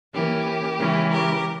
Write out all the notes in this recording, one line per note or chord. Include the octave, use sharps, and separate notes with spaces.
E3 A#3 C#4 G4
C#3 E3 G#3 C#4
G4 A#4